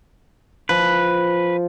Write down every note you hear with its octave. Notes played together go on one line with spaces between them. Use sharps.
F3 B4